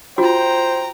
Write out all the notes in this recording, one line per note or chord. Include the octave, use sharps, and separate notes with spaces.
F4 F#4 C5 G5 A#5